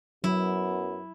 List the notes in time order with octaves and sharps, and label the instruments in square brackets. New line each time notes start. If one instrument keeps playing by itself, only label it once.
[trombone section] F#2 B3 [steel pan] F#3 [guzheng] E4